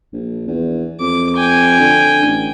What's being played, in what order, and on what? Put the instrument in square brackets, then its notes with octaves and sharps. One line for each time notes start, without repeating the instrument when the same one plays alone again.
[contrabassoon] A#1
E2
[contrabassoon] F2 [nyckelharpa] D6
[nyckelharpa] G5 G#5
[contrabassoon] D3
A1